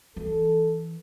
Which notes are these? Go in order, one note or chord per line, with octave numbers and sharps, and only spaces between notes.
E3 A4